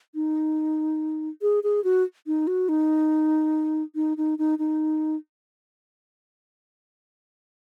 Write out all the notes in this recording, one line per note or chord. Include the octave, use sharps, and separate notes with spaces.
D#4
G#4
G#4
F#4
D#4
F#4
D#4
D#4
D#4
D#4
D#4